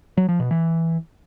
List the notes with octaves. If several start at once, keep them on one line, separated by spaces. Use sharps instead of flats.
F#3
F3
B2
E3